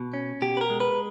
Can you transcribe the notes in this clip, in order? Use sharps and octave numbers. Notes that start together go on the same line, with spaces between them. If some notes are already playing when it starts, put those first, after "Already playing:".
Already playing: B2
C#4
B2 G4
B4
A#4
G#3
B4